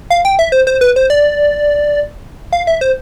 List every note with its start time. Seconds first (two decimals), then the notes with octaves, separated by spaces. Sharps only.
0.10 F5
0.25 G5
0.39 E5
0.52 C5
0.67 C5
0.81 B4
0.96 C5
1.10 D5
2.53 F5
2.67 E5
2.81 C5